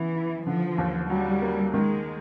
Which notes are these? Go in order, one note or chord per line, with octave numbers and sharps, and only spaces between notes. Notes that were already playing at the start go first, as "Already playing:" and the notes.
Already playing: C#3 E3 B3
E4
D3 F3
D#2
F#3 G3
A#3
D#3 G#3